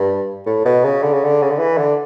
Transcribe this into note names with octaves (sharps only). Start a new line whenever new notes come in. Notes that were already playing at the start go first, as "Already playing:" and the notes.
Already playing: G2
A2
B2
C#3
D3
C#3
D3
C#3
D3
E3
D3